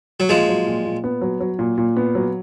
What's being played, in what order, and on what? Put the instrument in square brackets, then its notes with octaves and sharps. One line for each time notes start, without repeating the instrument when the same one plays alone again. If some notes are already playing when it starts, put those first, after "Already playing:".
[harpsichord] F#3
[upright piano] A#2 [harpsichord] F3 G#3
[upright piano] F#3
A#2
A#2
B3
F#3
F#3
A#2
A#2
B3
F#3